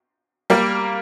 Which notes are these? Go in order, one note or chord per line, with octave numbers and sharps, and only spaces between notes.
G3 A#3